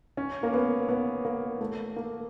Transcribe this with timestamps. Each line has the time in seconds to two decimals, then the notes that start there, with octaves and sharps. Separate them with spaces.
0.17 C#4
0.43 A#3
0.54 B3
0.89 B3
1.25 A#3
1.61 A3
1.96 A#3